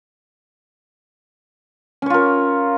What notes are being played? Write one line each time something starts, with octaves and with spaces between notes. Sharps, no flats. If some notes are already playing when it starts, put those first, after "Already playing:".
C#4 F4 A#4 C#5